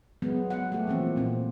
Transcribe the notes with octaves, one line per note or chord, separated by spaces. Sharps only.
F#3 G#3 B3
F#5
A3 A#3 G4
E3 F3 A#3 C4
A#2 C4